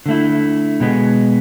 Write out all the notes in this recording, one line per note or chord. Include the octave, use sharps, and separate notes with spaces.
D3 A3 E4
B2 G#3 B3